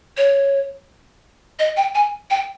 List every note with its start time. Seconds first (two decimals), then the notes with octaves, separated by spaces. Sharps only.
0.17 C#5
1.59 D#5
1.77 G5
1.95 G#5
2.30 G5